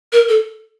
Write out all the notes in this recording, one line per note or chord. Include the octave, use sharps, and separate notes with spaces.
A#4
A4